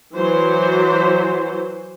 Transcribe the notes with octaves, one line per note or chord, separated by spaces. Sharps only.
E3 F#3 C5